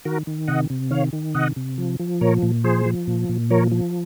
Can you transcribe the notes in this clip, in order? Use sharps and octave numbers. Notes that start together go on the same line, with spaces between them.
D#3 F#4 A#4
D#3
C3 D#5 F#5
C3
D#3 C#5 F5
D#3
C3 D#5 F#5
C3
F3
F3
A#2 A#4 C#5
A#2
F3 G#4 C5
F3
A#2
A#2
F3 A#4 C#5
F3